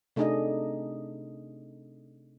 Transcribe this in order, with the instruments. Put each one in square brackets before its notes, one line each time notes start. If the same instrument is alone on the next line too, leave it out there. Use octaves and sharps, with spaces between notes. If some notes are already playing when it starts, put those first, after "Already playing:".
[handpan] C3 A3 D4 D#4 G#4 D#5